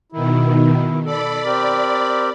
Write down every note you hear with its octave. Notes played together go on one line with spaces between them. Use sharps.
B2 D#3 E4
A4 D5 B5
C4 G4 A#4